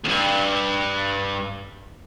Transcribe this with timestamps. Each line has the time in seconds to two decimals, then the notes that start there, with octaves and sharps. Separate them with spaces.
0.05 D2 G2